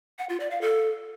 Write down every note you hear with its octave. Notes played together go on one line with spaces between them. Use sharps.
F#5
F4
D5
F5
A4